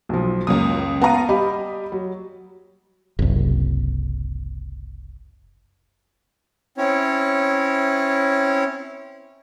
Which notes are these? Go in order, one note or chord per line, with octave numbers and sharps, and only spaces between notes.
B1 F3
C#2 F#2 A#3 D#6
B3 F5 F#5 A5 A#5 D#7
G3 G4 D#5 B5
F#3
F#1 C2
C4 C#4 E4 C#5